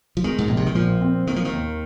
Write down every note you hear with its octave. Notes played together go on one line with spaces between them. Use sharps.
F3
D#3 G#3
G#2
A#1 A#2
C3
D#3
A#2 F3
C4
D#3 A#3
F3
D#3
D#2